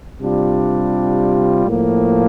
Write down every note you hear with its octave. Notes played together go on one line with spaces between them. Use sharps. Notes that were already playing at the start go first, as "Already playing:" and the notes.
C3 G3 D4 F4
A2 F3 A#3